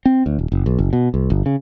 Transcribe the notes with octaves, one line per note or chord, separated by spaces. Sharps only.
C4
D2
D#1
F#1
B1
F#1
B2
C2
G1
C#3